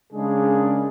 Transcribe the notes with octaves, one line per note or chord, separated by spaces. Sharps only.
C#3 G#3 A#3 D4 G#4